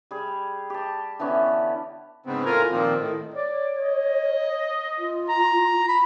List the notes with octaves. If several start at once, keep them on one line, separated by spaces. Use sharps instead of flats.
G3 G#4
G4 A5
D3 E3 B3 C#4
G#2 C#3 B3 C4
A2 F4 A#4 G#5 A#5
A#2 D#3 F3 A#3 C4
A2 D#3
C#5 D5
D#5
F4
A#5
B5